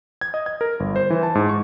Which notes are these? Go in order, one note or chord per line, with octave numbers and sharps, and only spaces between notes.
G#6
D#5
G#6
A#4
G1
C5
E3
A5
G#2
C#6